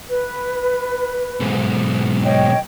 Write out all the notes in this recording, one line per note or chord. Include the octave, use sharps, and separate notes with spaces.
B4
B1 G#2
C#5 D#5 G5